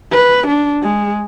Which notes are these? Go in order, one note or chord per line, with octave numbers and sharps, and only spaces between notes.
B4
D4
G#3